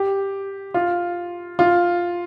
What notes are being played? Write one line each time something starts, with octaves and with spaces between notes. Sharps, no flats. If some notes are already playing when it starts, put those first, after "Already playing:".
Already playing: G4
F4
F4